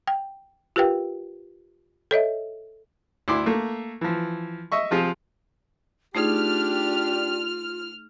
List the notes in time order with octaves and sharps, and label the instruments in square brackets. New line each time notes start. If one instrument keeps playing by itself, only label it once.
[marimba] G5
F4 G4 A#4 B4 F5 G5
A4 C#5 D#5 E5
[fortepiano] D2 E4 C6 D6
A3 A#3
E3 F3
D#5 E5 C#6
C3 F3 F4 G#4
[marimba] A3 D#4 G#4 [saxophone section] D4 G4 [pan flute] F4 [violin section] F6